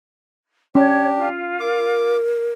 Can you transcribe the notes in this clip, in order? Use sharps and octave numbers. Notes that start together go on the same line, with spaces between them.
C#4 D4 G4 C#5
F4
A#4 D6